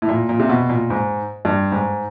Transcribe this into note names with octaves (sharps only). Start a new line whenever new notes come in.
A2
A#2
A#2
C3
B2
A#2
G#2
G2
G#2